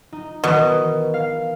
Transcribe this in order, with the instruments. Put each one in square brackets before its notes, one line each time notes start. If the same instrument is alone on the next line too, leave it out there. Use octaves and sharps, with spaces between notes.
[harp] D#4
[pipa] B2 [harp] D#3 E3
[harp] F5